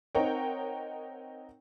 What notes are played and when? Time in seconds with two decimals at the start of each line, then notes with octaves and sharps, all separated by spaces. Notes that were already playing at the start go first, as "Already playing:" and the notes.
0.15 C4 D#4 A#4 C#5 F#5 G5